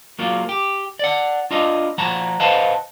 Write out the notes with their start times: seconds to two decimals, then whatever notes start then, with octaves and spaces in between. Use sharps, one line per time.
0.19 F#3 A#3 F4
0.49 G4
0.99 D5 F#5
1.51 D4 F4 D#5
1.98 F3 F#5 A5 A#5
2.40 B4 C5 D#5 F5 F#5 A5